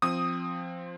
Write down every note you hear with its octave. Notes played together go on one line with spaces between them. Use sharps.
F3 C4 D#6